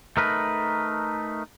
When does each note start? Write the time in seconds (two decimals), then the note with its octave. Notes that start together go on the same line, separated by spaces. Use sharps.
0.17 A3 D#4 A#4 B4